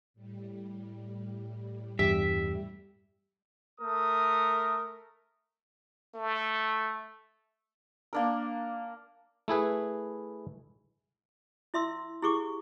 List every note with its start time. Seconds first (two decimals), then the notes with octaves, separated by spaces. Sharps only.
0.14 A2 G3
1.99 E2 G2 G4 E5
3.80 A3 A#4 D#6
6.14 A3
8.13 A#3 D4 A#4
9.48 A3 E4 G#4 B4
11.74 E4 E5 C6 E6
12.22 E4 G4 G#4 C#6 D6